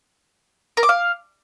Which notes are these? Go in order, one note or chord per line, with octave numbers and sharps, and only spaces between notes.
A#4
D6
F5